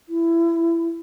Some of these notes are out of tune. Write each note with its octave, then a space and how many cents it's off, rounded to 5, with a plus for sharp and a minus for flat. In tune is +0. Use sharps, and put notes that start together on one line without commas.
E4 +20